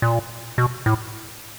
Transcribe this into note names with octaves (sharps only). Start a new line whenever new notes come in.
A#2
B2
A2